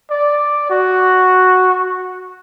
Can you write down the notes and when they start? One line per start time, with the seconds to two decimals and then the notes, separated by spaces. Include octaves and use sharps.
0.10 D5
0.70 F#4